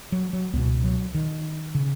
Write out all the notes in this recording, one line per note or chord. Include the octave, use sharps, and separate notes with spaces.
F#3
F#3
C#2 B2 B3
F#3
D#3
C#3